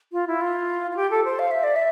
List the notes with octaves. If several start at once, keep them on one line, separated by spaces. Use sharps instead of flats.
F4
E4
F4
F4
G4
A4
C5
F5
E5
D5
E5